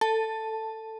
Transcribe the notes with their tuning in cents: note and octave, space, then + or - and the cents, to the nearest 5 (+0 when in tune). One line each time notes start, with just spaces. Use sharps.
A4 +15 A5 +0